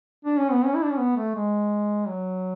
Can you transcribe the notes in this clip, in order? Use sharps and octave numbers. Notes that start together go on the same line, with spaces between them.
D4
C#4
B3
C#4
E4
D4
C#4
B3
A3
G#3
F#3